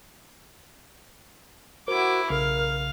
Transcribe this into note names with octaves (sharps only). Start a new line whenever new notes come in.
E4 F#4 A#4 C5 D6
B1 C#3 A#4 F5